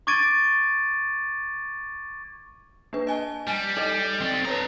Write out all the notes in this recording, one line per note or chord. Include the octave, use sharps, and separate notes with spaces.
C#6 D6 G#6 A6 D7 D#7
A#3 D4 B4
D#5 G#5 A5
G3 G#5
D#4 A4 D#5
C4 D5
D4 B4 C#5 A#5 D#6